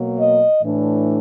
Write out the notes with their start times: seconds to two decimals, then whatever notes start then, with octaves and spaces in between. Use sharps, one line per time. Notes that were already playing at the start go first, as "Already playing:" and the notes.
Already playing: B2 F#3 A#3
0.19 D#5
0.62 A2 E3 A3 D4